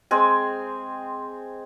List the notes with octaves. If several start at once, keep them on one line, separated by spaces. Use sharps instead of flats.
G#3 C4 G#5